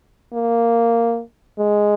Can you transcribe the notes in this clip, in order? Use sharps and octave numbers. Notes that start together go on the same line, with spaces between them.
A#3
G#3